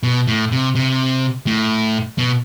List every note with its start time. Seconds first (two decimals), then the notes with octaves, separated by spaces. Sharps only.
0.03 B2
0.27 A2
0.52 C3
0.75 C3
1.47 A2
2.18 B2